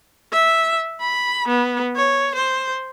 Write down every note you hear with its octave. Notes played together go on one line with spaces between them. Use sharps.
E5
B5
B3
C#5
C5